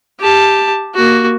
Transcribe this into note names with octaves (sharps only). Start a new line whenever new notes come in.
G4 A5
A#3 F#4